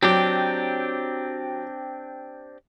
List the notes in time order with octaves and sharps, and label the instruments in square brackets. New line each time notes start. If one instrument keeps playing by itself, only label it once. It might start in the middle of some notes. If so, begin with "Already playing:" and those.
[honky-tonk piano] F#3 [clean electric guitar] C4 D4 G4